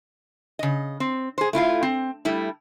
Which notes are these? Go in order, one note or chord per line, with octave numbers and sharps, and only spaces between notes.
C#3 D#5
C4
G#4 C5
A3 E4 F4 F5
C4
G3 A3 E4